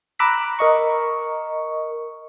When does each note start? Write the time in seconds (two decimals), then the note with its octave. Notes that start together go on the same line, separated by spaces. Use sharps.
0.19 A#5 B5 D6 E6 F#6 B6
0.59 A#4 D#5 C#6